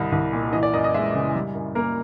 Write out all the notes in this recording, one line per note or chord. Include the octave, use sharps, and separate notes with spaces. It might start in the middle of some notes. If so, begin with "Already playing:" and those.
Already playing: C2 G3 D#5
C2
A#2
E3 D#5
D5
F#2 D#5
D#5
G#3 E5
C#3
G3
F#2
A#3 A#4